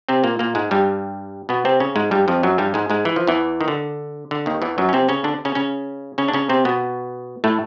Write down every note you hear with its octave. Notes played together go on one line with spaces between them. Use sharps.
C3 C4
A#2 A#3
A#2 A#3
G#2 G#3
G2 G3
B2 B3
C3 C4
C#3 C#4
G#2 G#3
G2 G3
F2 F3
F#2 F#3
G2 G3
G#2 G#3
G#2 G#3
E3
F3
E2 E3
D#3
D3
D3
D#2 D#3
E2 E3
F#2 F#3
C#4
C3 C4
C#3 C#4
D3 D4
C#3 C#4
C#3 C#4
C#3 C#4
D4
C#3 C#4
C3 C4
B2 B3
A2 A3